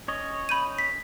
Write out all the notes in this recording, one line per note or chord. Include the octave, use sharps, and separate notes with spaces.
C#4 C#5 D#5
B5 G6 D#7
B6